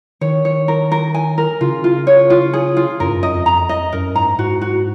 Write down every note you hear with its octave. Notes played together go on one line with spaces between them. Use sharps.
D#3 C#5
C#5
A#4
A#4
G#5
A#4
C#3 F4
F4
C#5
F4
G#4
F4
F#2 A#4
G#2
F#2
D#5
F2
A#5
D#5
F#2 A#4
G#2 A#5
G#2 F#4
F#4